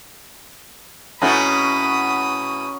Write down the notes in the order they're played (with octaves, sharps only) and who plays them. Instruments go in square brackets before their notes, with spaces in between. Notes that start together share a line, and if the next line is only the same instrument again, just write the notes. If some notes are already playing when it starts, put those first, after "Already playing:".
[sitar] B2 A3 E4 [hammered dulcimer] C#4 F#4 A#5 [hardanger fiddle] B5 D#6